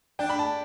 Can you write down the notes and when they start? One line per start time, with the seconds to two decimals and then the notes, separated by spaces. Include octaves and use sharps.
0.19 D4 G5
0.29 B5
0.39 A5